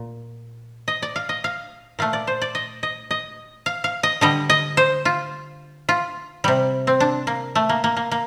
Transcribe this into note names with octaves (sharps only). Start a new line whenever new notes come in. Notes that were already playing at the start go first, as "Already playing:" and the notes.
Already playing: A#2
D#5
D5
F5
D#5
F5
A#2 A3 F5
D5
C5
D5
D#5
D#5
D#5
F5
F5
D#5
D3 G3 D#5
D#5
C5
F4
F4
C3 G3
C4
D4
A#3
A3
A#3
A#3
A#3
A#3